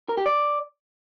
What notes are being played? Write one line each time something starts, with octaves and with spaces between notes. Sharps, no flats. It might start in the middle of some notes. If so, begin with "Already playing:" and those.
A#4
G4
D5